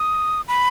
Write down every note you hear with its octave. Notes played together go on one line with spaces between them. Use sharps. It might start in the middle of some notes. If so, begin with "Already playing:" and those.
Already playing: D#6
B5